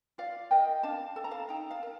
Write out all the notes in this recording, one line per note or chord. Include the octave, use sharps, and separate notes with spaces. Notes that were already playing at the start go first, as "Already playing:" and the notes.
F4 D5 F5
A#4 D#5 G5
D4 F5 A5
A4 A5
A#5
F5 A5
D#4 G5 A#5
F5 A5
A#4